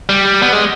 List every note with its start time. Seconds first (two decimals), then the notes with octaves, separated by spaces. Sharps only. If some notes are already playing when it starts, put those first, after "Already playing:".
0.09 G3
0.42 B3
0.53 G#3